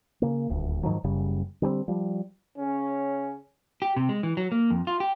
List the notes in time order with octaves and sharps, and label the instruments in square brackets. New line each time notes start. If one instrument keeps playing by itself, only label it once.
[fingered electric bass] C#3 A#3
D#1 D2
G#2 D#3 F3 F#3
F#1 F#2 C#3 G3
D3 G3 A#3 C4
F3 G3
[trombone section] C#3 C#4
[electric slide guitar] G4
C3
G#3
E3
F#3
A#3
F2
F4
G4